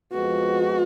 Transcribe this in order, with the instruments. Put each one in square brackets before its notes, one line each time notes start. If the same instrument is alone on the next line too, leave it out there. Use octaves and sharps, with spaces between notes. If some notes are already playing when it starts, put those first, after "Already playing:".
[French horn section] F2 F3 G#3 B3 [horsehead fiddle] F#4